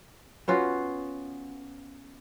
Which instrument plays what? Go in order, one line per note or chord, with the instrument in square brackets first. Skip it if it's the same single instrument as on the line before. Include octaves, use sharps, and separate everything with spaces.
[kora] B3 C#4 F4 F#4